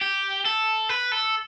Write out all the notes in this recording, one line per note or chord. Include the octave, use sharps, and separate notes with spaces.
G4
A4
B4
A4